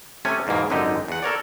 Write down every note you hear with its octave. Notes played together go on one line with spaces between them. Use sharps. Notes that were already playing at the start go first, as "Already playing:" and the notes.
C3 A3 C#4 G#5
E2 G#2 B2 A#3
G#1 F#2 D3 D#4 G4 D#5
E2 F#5
A4 A#4 C#5 D5